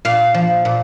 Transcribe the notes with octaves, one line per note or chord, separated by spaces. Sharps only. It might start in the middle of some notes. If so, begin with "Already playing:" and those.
A#2 F5
F3
A#2